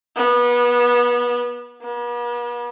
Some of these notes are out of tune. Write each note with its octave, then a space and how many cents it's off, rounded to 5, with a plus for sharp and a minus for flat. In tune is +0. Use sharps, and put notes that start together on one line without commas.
B3 -30
B3 -45